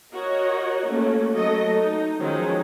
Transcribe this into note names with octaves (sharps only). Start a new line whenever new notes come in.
F#4 A#4 C#5 D#5
A3 A#3 C#4 F#4
F#3 A3 A4 D#5
D#4
D#3 F3 F#3 G#3 C#4 D#4